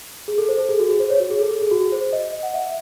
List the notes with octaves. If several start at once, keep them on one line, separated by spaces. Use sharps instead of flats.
G#4
A4
C5
A4
G#4
F#4
G#4
C5
C#5
F#4
G#4
A4
G#4
G#4
F#4
G#4
C5
D#5
D#5
F#5
E5